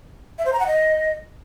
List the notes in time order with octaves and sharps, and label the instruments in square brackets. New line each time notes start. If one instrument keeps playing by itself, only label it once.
[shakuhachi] E5
C5
A#5
F#5
D#5